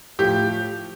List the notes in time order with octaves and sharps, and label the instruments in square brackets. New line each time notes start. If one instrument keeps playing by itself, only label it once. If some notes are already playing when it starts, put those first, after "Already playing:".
[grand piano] A2 F3 G4